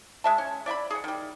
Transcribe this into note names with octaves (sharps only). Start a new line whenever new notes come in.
G#3 E5 A5
C#4
D5 E5 G5 B5
G#4 F#5
D#3 G3